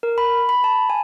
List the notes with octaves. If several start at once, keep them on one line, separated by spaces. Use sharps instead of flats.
A#4
B5
B5
A5
G#5